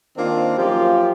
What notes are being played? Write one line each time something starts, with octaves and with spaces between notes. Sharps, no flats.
D#3 A#3 C4 D4 F4
F#2 F3 A#3 F4 G4